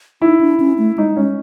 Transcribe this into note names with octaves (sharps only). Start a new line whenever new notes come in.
D#4 E4
D4
C#4
A3
G#3 D#4
G#3 C#4